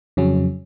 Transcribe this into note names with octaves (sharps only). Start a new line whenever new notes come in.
F2 C#3 F#3 C#4